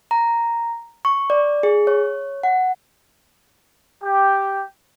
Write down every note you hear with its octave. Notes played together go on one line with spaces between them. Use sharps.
A#5
C#6
D5
G#4
C#5
F#5
G4